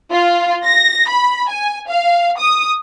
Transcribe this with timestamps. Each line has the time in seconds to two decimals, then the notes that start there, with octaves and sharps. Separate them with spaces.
0.12 F4
0.65 A#6
1.09 B5
1.49 G#5
1.89 F5
2.40 D#6